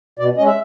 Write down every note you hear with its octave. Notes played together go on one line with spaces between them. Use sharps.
B2 D5
G#3 C#4 D#5
E5